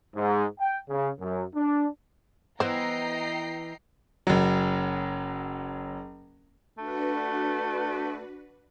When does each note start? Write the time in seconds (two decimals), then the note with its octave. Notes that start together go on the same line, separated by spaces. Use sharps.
0.15 G#2
0.59 G5
0.89 C#3
1.19 F#2
1.54 D4
2.60 E3 B3 C5 D#5 G5 A#5 C7
4.27 F#1 F#3
6.78 A3 D4 F#4 B4